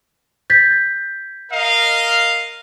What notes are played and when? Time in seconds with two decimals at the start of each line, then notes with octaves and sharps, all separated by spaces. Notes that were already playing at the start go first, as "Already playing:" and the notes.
0.50 G6 A6 B6
1.51 A#4 D#5 F5